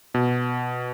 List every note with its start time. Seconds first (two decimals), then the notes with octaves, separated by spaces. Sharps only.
0.14 B2